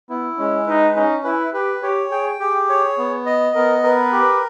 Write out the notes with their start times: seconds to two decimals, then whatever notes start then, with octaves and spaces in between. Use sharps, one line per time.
0.09 B3 E4
0.38 G#3 C#4
0.67 D#4 B4
0.96 C#4 D#4
1.24 E4 B4
1.54 G4 B4
1.83 G4 C#5
2.11 G#4 G5
2.40 G4 G#4
2.69 C#5
2.98 B3
3.26 D#5
3.55 B3 A#4
3.83 A#4 B4
4.12 G4